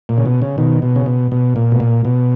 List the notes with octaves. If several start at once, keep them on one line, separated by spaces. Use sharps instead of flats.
A#2
C#3
B2
C#3
B2 D#3
B2
C#3
B2
B2
A#2
B2
A#2
B2